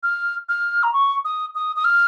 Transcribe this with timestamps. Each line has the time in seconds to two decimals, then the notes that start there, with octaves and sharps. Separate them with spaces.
0.03 F6
0.49 F6
0.83 A#5
0.93 C#6
1.25 D#6
1.55 D#6
1.76 D#6
1.84 F6